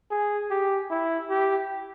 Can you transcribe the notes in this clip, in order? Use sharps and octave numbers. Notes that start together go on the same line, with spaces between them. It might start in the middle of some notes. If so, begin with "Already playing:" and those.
G#4
G4
E4
G4